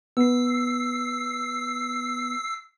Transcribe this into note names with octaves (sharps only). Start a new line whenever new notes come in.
B3 E6 C7